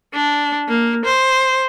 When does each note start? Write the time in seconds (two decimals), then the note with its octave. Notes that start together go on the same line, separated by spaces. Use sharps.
0.14 D4
0.68 A#3
1.05 C5